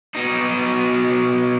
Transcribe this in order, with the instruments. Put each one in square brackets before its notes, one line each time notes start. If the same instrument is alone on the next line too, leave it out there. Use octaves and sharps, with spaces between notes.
[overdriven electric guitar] B2 D#4